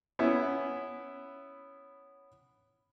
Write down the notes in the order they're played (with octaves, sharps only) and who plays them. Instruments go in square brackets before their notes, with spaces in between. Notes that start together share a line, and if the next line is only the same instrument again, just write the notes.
[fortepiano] B3 C#4 E4